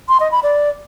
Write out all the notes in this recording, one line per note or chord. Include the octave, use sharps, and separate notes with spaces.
C6
D#5
B5
D5